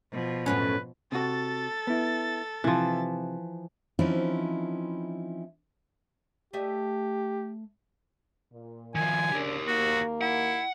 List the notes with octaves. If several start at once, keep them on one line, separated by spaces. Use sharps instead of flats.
B2 F3
F#2 A2 C#4 B4
C3 F#4 A4 A6
B3 E4
C3 E3 F3
E3 F3 C4 C#4 D#4 E4
A3 G4 D#5 E5
A#2
D#3 F3 G#5
C#3 A#3 D4 G4 A#4
D#2 A#3 F#4
E4 F#5